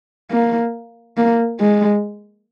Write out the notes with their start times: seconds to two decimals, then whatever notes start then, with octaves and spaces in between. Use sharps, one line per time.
0.31 A#3
1.18 A#3
1.60 G#3